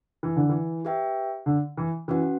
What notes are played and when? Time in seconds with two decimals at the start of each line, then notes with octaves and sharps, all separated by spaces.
0.23 E3
0.36 D3
0.49 E3
0.85 G4 B4 E5 G5
1.46 D3
1.77 E3
2.08 E3 C#4 F#4 B4 F#5